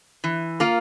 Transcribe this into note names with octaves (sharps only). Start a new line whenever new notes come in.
E3
A#3 F4 A#4